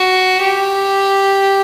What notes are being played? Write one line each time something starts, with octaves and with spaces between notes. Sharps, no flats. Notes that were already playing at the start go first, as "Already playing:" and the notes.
Already playing: F#4
G4